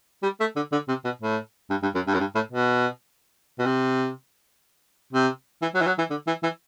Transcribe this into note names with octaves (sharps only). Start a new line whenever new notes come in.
G3
A3
D3
D3
C3
B2
A2
G2
G2
F#2
G2
F#2
G2
A2
B2
B2
C3
C3
E3
F#3
E3
F#3
E3
D3
E3
E3